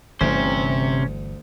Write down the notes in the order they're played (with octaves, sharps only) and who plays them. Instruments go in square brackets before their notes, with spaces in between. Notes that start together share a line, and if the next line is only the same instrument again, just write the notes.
[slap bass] G1 E3 [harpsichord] D2 [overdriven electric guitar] C3 C5 [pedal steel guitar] C#4